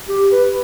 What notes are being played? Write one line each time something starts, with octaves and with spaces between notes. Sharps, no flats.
G4
B4